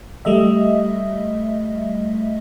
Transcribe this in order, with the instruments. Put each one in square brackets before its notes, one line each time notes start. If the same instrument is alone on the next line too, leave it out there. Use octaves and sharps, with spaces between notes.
[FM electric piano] G3 A3 D#5 E5